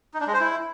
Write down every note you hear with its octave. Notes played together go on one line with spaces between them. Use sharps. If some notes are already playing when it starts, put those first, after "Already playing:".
D#4
D4
G#3
C5
E4